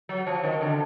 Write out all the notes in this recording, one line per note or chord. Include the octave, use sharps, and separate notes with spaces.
F#3
F3
D#3
D3